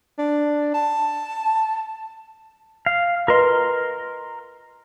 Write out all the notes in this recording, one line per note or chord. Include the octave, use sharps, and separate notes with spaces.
D4
A5
F5
F4 A#4 B4 D#5 C6